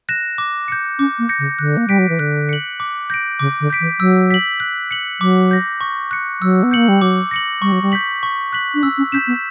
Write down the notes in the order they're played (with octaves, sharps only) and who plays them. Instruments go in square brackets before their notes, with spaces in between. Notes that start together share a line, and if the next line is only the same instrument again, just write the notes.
[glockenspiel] F#6 A#6 E7
D6
G6 C#7
[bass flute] C#4 [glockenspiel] D6
[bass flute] A#3
[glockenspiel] G6 A#6 C#7
[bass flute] C#3
[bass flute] D3 [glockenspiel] F#6
[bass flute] A#3
[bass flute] G3 [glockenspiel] B6 D7
[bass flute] F#3
E3
[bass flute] D3 [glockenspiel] F#6
[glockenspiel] C#7 F#7
D6
G6 A#6 D7
[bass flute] C#3 [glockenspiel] D6
[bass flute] D3
[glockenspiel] G6 B6 D7
[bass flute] E3
[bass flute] F#3 [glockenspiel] E6
[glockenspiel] B6 F#7
F#6
C#7 F#7
[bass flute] F#3 [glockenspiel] D6
[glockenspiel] G6 A#6
C#6
F#6 C#7
[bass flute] F#3 [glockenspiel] E6
[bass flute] B3
[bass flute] A#3 [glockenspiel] G6 C#7 F#7
[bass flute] G3
[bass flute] F#3 [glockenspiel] D6
[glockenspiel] A#6 C#7 F#7
[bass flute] G3 [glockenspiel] C#6
[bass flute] F#3
G3
[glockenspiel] G6 B6 F#7
C#6
F#6 B6 F#7
[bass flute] D4
[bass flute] C#4 [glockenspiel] E6
[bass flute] C#4
[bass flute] C#4 [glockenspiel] G6 B6 E7
[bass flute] B3